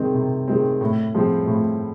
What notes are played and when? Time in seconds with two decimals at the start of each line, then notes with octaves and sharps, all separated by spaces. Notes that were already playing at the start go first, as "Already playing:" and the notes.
Already playing: C3 D#3 G#3 C4
0.14 C3
0.48 D#3 G#3 C4
0.81 A2
1.14 F3 G#3 C4
1.47 A2